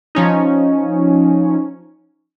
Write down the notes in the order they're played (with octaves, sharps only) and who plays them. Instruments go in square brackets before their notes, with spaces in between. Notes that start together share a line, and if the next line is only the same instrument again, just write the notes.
[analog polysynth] F3 C#4 D#4